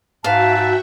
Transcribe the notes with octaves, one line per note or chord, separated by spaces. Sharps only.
G#2 F#4 B4 E5 F5 G5 A5